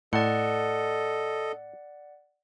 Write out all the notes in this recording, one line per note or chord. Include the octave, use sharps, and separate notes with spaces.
A2 A4 D5 D#5 F#5